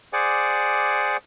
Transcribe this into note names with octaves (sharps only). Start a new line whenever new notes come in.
G#4 C5 D5 F#5 G#5 D6